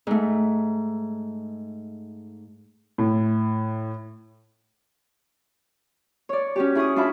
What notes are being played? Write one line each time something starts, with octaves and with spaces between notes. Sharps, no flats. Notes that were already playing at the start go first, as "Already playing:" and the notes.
G#2 A3
A2
C#5 D5
C#4 F#4 G4
E4 G#4 C#6 D#6
D4 F4 F#4 E5 B5